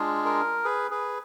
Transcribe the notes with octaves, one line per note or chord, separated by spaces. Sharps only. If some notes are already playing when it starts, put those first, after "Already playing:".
Already playing: G#3 D4 F4 G#4
A#4
G#4 B4
G#4 B4